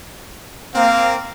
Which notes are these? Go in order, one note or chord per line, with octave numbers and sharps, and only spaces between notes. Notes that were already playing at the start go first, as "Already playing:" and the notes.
A#3 C4 F5